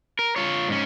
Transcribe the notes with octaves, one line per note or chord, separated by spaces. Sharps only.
A#4
F4 C#5
G#2 C#4